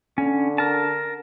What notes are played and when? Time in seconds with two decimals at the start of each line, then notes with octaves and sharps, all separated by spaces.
0.18 D3 C#4
0.58 A#4 A5